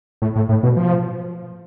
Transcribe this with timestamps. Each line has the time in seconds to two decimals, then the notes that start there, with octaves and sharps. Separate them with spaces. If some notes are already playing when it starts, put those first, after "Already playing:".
0.22 A2
0.36 A2
0.49 A2
0.63 B2
0.77 F3